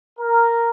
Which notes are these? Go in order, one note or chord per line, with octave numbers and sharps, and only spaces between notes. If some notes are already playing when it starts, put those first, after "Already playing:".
A#4